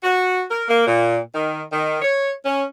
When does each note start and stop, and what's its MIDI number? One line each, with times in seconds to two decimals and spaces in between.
0.03 0.43 66
0.50 0.64 70
0.69 0.82 58
0.87 1.18 46
1.34 1.63 51
1.72 1.98 51
2.02 2.30 73
2.45 2.64 61